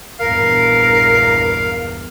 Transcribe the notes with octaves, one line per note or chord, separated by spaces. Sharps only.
A#1 E2 G2 A#4 F5